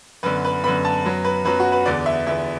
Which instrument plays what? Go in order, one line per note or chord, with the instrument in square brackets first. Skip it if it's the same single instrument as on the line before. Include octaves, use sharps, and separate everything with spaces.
[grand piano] F#2 D3 B3 B4
B4
F#2 D3 B3 B5
A5
F#2 F#3 B3
B4
F#2 F#3 B3 B4
F#4
B4
E2 D3 B3 D5
E5
E2 D3 B3 E5